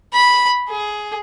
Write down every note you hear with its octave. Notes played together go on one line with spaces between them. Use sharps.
B5
G#4